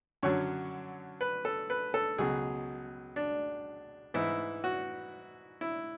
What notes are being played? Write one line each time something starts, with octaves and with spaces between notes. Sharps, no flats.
F#2 D3 F#3 C#5
B4
A4
B4
A4
C#2 B2 F#3 G#4
D4
G#2 E3 E4
F#4
E4